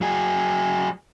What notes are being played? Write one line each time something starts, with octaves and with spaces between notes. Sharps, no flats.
F#3 G#4